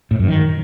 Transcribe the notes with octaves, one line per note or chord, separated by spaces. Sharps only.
A2
F#2
D#3